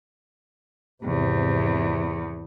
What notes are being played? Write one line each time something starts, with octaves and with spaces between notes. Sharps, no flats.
G#1 E2 C3